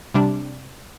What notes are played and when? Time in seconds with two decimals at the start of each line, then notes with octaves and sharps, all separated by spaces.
0.14 C3 G3 D4